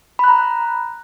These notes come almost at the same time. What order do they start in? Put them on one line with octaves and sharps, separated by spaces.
B5 F#6 A#5